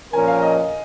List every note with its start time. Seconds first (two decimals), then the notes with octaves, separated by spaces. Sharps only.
0.13 A#2 F3 C#4 A#4 G#5
0.28 F5
0.42 D#5